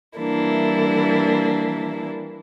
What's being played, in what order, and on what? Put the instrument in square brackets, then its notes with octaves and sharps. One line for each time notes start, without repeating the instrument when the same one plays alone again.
[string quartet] E3 G3 A#3 D4 E4